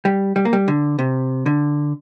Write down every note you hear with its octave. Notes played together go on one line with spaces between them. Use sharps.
G3
G3
A#3
G3
D3
C3
D3